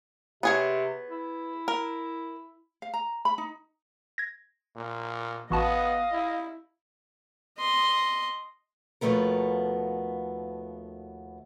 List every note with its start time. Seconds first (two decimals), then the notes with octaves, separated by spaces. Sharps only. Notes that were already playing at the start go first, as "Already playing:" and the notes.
0.43 C3 B3 G#4 C#5
1.10 E4
1.68 A#4
2.82 F5
2.94 A#5
3.25 B5
3.38 D#4
4.18 G#6 A#6
4.76 A#2
5.50 A1 B3 F#4 D#5 F5 A5
6.12 E4
7.58 D#5 C6
9.01 D#2 B2 F3 A3 B3 A#4